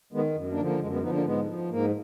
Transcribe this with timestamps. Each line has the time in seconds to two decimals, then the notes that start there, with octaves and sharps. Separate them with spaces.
0.13 D#3 G#3 B3
0.35 F#2
0.50 A#3 D4
0.57 D3 F3
0.65 A#3
0.80 F#2 G#3
0.92 G#3 B3
1.02 D3 F3 B3 D#4
1.13 A#3 D4
1.24 G#2 G#3 B3
1.47 F3
1.69 G#2 A#3